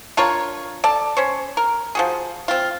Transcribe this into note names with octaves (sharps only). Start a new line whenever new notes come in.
D4 F4 A#4 C#5
A4 D5 A5
C#4 C5 C#5
A#4
F3 F#4 G#4
C4 F4